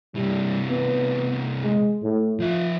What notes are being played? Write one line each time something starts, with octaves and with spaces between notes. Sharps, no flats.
C3 E3 G3
B3
G#3
A2
F3 F4 E5